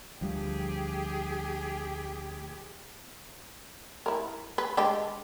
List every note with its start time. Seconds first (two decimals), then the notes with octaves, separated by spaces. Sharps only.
0.21 D2 F3 G3 G4 G#4
4.06 E4 A#4
4.58 B4
4.77 G#3 D4 G4